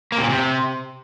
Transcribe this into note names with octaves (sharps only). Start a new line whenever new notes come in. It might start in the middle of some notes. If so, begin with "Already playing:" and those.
A#3
C3
A#2
C3